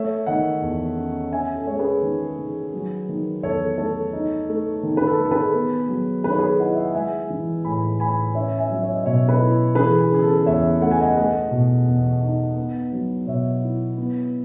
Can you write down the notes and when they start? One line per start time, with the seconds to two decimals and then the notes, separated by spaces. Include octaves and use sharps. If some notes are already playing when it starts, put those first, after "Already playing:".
Already playing: A3 C#5 E5
0.27 D#3 D#5 F#5
0.62 E2
0.97 C#4
1.32 C#4 E5 G#5
1.55 A4
1.67 G#3 C#5
1.79 G#4 B4
2.02 D#3
2.38 D#3
2.74 F#3
3.09 D#3
3.43 E2 A4 C#5
3.78 A3 A4 C#5
4.13 D#4
4.49 A3
4.83 D#3
4.97 B4
5.07 A4
5.20 D#3
5.25 A4
5.30 G#4 B4
5.55 B3
5.89 F#3
6.24 D#3 B4
6.31 C#5
6.39 G#4 B4
6.59 E4 D#5 F#5
6.74 E5
6.85 F#5
6.94 G#3 E5 G#5
7.30 E3
7.65 A2 G#5 B5
8.00 A2 G#5 B5
8.35 C#4 C#5 E5
8.58 E5 G#5
8.70 F#3
8.82 C#5 E5
8.94 D#5
9.05 B2 C#5 E5
9.29 B4 D#5
9.41 E4
9.75 E3 G#4 B4
9.99 G#4
10.11 C#3 G#4
10.22 A4
10.46 E2 C#5 E5
10.81 A3 F#5
10.91 G#5
11.01 D#5 F#5
11.17 A3 D#5 F#5
11.51 B2
11.87 E2
12.22 D#4
12.57 B3
12.92 F#3
13.27 B2 C#5 E5
13.63 E4
13.97 B3